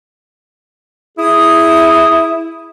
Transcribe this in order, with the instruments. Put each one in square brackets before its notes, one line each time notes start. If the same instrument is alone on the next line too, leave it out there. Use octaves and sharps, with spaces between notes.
[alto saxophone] E4 [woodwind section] G#4 D#6